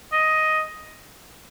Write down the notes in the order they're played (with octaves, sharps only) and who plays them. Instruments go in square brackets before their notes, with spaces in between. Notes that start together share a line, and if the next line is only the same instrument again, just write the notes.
[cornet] D#5